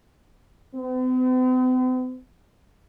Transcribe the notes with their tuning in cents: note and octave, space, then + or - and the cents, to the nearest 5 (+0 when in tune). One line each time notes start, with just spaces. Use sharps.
C4 -45